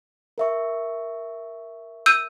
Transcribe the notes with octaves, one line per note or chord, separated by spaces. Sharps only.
A#4 E5 C#6
E6 G6 D#7